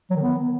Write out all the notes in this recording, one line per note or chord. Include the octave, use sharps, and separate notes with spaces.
F#3
D#3
B3